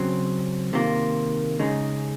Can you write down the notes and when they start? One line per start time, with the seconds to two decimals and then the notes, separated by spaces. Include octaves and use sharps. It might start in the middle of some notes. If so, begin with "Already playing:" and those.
Already playing: C#3 F#3 C4
0.73 C3 D#3 A#3 F4
1.59 C#3 G#3 D#4